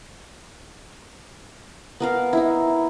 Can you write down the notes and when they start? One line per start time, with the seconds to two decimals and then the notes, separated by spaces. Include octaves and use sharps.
2.00 B3 A#4 F5
2.33 D#4 E4